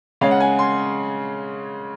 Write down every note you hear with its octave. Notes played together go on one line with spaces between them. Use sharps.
C#3 G#3 C#4 F5
F#5
G#5
C6